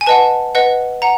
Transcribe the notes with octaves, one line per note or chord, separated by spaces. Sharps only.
G#5
B4 D#5 F#5 A5
B4 D#5 F#5
F#5 A#5